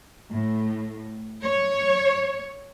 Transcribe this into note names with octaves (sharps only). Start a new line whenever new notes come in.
A2
C#5